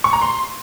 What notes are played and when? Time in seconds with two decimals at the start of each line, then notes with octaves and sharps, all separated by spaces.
0.04 C#6
0.13 A#5
0.22 C6